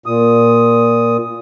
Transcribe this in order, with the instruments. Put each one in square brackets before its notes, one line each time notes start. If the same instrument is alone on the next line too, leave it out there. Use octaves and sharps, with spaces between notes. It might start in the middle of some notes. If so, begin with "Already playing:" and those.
[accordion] A#2 D#6